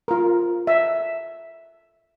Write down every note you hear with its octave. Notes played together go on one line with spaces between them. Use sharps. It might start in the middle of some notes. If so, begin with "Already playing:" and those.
F4 A#4
E5